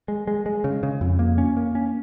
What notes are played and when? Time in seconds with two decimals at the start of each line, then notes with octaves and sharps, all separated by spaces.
0.08 G#3
0.27 G#3
0.46 G#3
0.64 C#3
0.83 C#3
1.01 F2
1.19 A#3
1.38 C#4
1.57 A#3
1.75 C#4